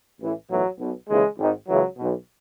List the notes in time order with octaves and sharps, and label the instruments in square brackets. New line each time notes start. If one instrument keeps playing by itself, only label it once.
[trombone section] A1 A2 E3
B1 A2 E3 F#3
B1 B2
D#2 C#3 E3 G#3
G#1 G#2 D#3
C#2 C#3 E3 F#3
B1 B2